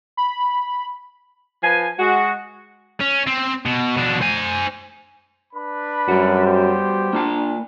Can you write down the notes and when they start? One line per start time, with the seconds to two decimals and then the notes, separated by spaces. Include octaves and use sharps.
0.17 B5
1.63 F3 B4 G#5
1.99 G#3 F#4
3.00 C#4
3.27 C4
3.66 B2
3.97 B2 D4
4.22 C5 G#5
5.53 D4 B4 B5
6.08 F#2 G3 F#4
6.45 B3 G4 C5
7.13 A#3 D4 F4 A5